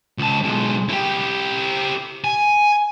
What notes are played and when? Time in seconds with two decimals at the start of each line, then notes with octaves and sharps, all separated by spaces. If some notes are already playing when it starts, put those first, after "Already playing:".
0.18 C#2 A5
0.44 B1 G#3
0.89 E4 G4
2.24 G#5